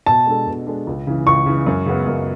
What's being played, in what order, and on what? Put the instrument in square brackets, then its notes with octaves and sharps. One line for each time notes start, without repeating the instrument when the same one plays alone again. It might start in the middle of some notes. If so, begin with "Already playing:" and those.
[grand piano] B2 [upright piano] A5
[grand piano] G#3 D4 A4
B2
G#3 D4 A4
C#2
C#3 E3
[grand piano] C#2 [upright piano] C#6
[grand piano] C#3 E3
F#2
C#3 G#3 B3
F#2